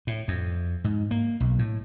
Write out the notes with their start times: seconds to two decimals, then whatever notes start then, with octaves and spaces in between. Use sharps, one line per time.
0.07 A2
0.28 F2
0.84 G#2
1.11 A#3
1.40 B1
1.59 A2